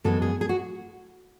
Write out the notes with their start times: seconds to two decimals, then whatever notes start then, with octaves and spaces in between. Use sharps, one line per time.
0.04 F#2 E3 G#3 B3 A4
0.22 G#4
0.41 G#4
0.49 F#4